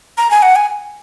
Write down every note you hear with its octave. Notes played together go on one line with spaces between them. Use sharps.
A#5
G#5
F#5
G#5